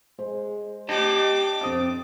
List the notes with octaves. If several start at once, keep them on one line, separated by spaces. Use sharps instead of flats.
G#3 C5
D4 G4 D#5 G5 A5 D6
F2 C4 D#6 A6